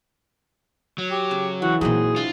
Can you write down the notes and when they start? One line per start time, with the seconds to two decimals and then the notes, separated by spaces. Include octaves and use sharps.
0.98 F#3
1.11 G4
1.31 C#3
1.62 E3 F#4
1.81 A#2 E3 F#3 C4 D#4 G#4
2.16 D4 E4 F4